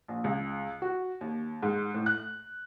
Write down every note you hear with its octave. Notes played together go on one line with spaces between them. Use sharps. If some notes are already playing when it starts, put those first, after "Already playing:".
A#1
C#2
F#4
D#2
G#2
A2
F#6